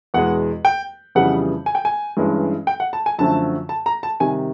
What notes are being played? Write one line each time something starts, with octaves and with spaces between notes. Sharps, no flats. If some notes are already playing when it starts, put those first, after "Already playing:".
E2 B2 G#3 F#5
G5
F2 C#3 E3 G3 B3 F#5
G#5
G5
G#5
G2 E3 G#3 C#4
G5
F#5
A5
G#5
F#2 D3 F3 A3 A5
A5
A#5
A5
C3 D#3 G3 G#5